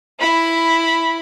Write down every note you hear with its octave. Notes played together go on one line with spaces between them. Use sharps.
E4 B5